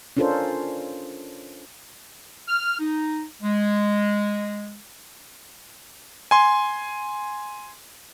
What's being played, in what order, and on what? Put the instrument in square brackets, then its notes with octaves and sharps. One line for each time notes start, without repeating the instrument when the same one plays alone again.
[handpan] C#4 D4 F4 A4 A#4 C5
[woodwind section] F6
D#4
G#3
[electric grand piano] G#5 C6